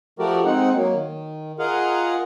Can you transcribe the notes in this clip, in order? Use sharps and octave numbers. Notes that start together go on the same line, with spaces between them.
F3 A3 F#4 G4 A#4 D5
G#3 C4 D#4 F#5
F#3 A#3
D#3
F4 G#4 A#4 D#5 F5 F#5